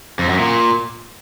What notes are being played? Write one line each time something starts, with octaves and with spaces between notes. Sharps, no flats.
F2
F#2
A#2